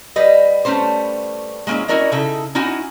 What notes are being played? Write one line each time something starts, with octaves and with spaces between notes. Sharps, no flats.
G3 B4 D#5
G3 A3 C#4 B4 C5
G#3 A#3 C4 C#4 E4
C#4 E4 F#4 A#4 D5 D#5
C#3 D#4 E4 A4
C#4 D#4 E4 F#4 F#5 G#5